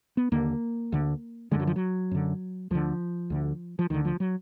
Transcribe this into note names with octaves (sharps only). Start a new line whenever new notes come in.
B3
D#2 D3 A#3
D2 D3
F#2 D3 G#3
F#3
F3
F#3
F#2 D3
D2 D3 F3
D2 D3
F3
D2 D3 D#3
F3
F#3